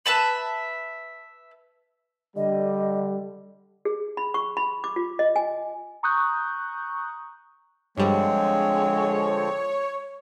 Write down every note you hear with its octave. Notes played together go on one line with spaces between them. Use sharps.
B4 E5 A5 B5
D3 G3 D#5
G#4
B5
C#6
B5
D6
F4
D#5
G#5
A#5 C#6 D#6 F#6 G6
G2 D3 F3 G3 G#3 C4 C#5